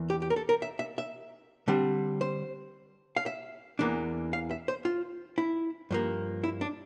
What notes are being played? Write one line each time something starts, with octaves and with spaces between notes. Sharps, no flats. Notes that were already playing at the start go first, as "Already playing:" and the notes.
Already playing: E2 E3 A#3
G4
G4
A#4
A4
A#4
E5
E5
E5
D3 G3 C4
C5
F5
E5
E2 E3 A#3 D4
F5
E5
C5
F4
E4
G2 F3 A#3
E4
D4